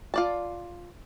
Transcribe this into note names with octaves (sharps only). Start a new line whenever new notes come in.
F4 D5 A5